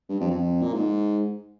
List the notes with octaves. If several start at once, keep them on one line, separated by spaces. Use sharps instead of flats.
G2
F2
F2
A#2
G#2